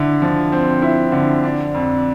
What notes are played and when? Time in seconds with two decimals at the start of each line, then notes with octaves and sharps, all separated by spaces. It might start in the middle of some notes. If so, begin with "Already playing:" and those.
Already playing: D3 E4
0.22 F3
0.52 C4
0.82 E4
1.12 D3
1.43 D4
1.74 F2